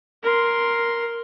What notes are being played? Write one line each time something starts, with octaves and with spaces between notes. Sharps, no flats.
A#4 C6